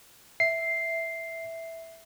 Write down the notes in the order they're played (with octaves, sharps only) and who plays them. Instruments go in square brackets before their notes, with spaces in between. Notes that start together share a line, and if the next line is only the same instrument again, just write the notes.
[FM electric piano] E5 [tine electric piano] C7